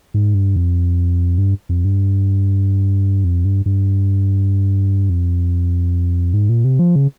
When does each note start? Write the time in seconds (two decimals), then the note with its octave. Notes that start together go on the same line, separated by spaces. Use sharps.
0.14 G#2
0.34 G2
0.56 F2
1.38 G2
1.69 F2
1.85 G2
3.24 F2
3.45 G2
3.66 G2
5.10 F2
6.33 G#2
6.49 A#2
6.64 C3
6.79 F3
6.96 C#3